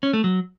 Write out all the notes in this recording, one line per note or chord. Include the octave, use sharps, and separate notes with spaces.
C#4
A3
F#3